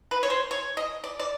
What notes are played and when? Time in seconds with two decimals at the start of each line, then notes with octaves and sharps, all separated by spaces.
0.11 B4
0.23 C#5
0.30 C5
0.51 C#5
0.77 D#5
1.04 D5
1.20 D5